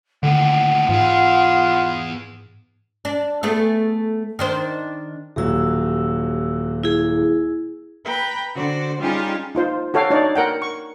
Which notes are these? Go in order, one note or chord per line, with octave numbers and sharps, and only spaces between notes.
D#2 A2 D3 F#5
E2 G#2 F4 G#4
D4
A3 B3 G#4
D#3 D4 C5
D#1 F#3 G4 E6
E4 G#4
B4 G5 A#5 B5
D3 F#4 C5 D5
G3 C#4 D#4 F4 G4 G#4
D#4 F4 C5
F#4 A4 C#5 F5 G5
D4 D#4 C#5 D5
A#4 F#5 G5
C#6